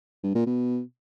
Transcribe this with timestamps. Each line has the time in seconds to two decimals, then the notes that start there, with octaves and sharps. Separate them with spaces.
0.23 G2
0.35 A#2
0.47 B2